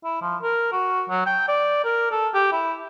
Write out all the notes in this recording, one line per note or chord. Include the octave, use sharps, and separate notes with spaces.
E4
F3
A#4
F#4
F#3
G5
D5
A#4
A4
G4
E4